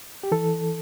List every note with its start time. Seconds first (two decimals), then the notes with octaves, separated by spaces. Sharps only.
0.23 G4
0.32 E3 A4